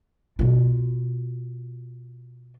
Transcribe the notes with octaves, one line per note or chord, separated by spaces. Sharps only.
B2 F4